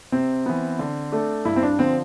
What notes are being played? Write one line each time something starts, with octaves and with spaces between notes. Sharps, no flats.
C3 C4
E3 B3
D3
A3 D4 A4
G2 E4
C4
D4
D3 F3 C4